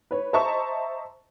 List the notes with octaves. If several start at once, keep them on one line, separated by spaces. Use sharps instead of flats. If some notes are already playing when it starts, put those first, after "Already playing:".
B4 C#5
C5 D#5 E5 A5 A#5 C#6